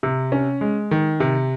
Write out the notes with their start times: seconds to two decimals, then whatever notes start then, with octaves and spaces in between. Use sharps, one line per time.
0.03 C3
0.32 C#4
0.61 G#3
0.91 D#3
1.20 C3